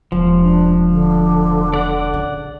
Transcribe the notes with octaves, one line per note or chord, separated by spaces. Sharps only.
E1 F3
D4
D3
D5 F#5
C#3